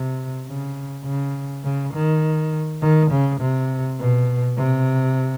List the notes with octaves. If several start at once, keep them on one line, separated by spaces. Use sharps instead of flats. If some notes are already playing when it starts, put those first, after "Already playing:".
Already playing: C3
C#3
C#3
C#3
D#3
D#3
C#3
C3
B2
C3